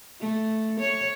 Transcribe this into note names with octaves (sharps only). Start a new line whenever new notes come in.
A3
C#5